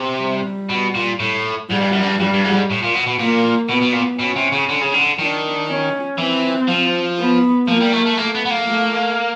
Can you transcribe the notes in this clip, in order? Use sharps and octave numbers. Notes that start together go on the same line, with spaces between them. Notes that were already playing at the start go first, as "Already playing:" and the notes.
Already playing: C3
G3
B2
A#2
A2
G#2 G3
G2
F#2
G2
G2 G3
G2
G#2
A2
A#2
B2
B2
A#2 A#3
B2 B3
B2
A#2
B2 C#4
C3
C#3
D3
C#3
D3
D#3 D4
C#4
E3 C4
F3
B3
F3 A#3
G3
A3
A3
A3 A#3
B3
B3
A#3
A3